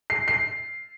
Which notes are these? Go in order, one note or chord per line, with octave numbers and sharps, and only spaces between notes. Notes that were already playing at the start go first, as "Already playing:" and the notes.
C7
C7